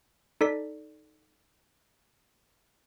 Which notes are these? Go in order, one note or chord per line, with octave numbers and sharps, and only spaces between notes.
D#4 A4 D5 B6